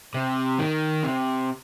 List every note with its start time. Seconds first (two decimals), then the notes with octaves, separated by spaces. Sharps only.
0.14 C3
0.59 D#3
1.03 C3